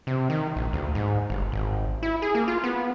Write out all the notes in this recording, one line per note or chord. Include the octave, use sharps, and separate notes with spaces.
C3
D#3
A#1
D2
G#2
G1
G#1
E4
G#4
A#3
F4
B3